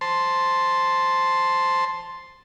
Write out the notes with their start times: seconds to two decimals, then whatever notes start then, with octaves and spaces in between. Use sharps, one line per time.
0.01 C5 A5 C6